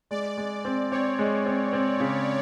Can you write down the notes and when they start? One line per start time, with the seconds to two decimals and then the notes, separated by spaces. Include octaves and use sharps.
0.11 G#3 D5
0.38 G#3
0.65 C4
0.92 C4 C#5
1.19 G#3
1.46 C4
1.73 C4
2.00 C#3